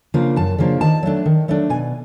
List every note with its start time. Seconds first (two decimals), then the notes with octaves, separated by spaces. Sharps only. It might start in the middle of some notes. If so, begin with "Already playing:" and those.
0.14 C#3 F3 A#3 D4
0.36 F#2 A5
0.58 C#3 F3 A#3 D4
0.81 D#3 A5
1.03 F#3 A3 D4
1.26 D#3
1.48 F#3 A3 D4
1.70 B2 G#5